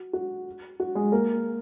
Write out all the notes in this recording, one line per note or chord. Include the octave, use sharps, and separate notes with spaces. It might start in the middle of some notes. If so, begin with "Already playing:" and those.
Already playing: F#4
F#4
F#4
G#3 G#4
A#3 A#4